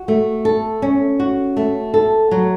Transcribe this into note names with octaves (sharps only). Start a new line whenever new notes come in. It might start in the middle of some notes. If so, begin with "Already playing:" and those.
Already playing: F#4
A3
A4
C#4
F#4
A3
A4
F#3